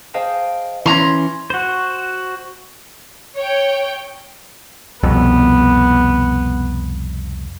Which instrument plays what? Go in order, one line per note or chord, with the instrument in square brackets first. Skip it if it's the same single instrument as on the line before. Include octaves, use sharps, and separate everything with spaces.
[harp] G#4 C5 D#5 F5 G5 A5
[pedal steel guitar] E3 C#4 [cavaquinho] A#5 C6
[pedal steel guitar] F#4 C5
[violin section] C#5 G5
[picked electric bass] C2 F2 B2 [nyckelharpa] B3